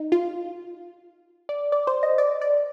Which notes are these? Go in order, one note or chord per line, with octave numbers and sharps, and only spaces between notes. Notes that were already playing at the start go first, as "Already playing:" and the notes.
Already playing: D#4
F4
D5
D5
C5
D#5
D5
D5